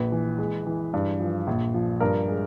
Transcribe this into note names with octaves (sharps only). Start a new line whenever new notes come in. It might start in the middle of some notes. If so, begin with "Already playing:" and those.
Already playing: A#1 B4
E3
G#3
E3
G2
F3
A#1
F3
G2 A#4
G#3